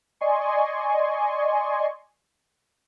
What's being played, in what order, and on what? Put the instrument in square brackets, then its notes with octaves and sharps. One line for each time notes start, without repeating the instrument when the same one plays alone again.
[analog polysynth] D5 D#5 G#5 C6 C#6